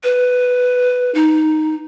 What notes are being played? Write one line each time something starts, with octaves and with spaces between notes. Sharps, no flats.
B4
D#4